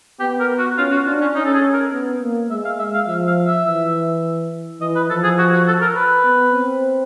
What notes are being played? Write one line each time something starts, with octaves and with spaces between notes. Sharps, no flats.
B3 G4
A#4
F#4
C#4 F4
F#4
D4 F4
C#4
C#4 D#4
A4
G#4
A#4
B3
A#3
G#3 E5
F5
E5
F5
F3 E5
F5
E5
E3
E3 D#5
B4
F3 A4
G#4
F#4
F#4
A4
A#4
B4
B3
C4